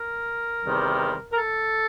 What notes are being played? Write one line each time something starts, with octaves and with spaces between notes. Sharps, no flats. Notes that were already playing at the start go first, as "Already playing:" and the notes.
Already playing: A#4
E2 C3 D#3 G3
A#4
A4